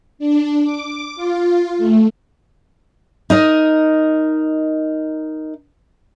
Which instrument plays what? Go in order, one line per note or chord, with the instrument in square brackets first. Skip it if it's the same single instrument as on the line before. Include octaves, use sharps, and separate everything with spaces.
[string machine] D4
D6
F4
A3
[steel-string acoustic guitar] D#4 A#4 D#5